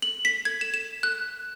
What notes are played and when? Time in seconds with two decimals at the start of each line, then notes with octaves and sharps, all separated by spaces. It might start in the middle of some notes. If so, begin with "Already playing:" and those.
0.02 F#7
0.25 B6
0.45 G#6
0.61 E7
0.74 E7
1.03 F#6